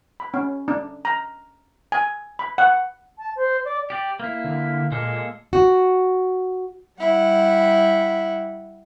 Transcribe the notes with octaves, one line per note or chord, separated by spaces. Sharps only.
B5
C#4
D4
A#5
G#5
B5
F#5
A5
C5
D5
G4 D5
A#3 E4
D3
A#2 G#3 A#3 A4
F#4
G3 E4 F#5